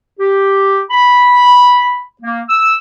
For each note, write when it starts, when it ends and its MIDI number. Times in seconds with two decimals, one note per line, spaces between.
0.20 0.83 67
0.90 2.05 83
2.22 2.41 58
2.48 2.76 88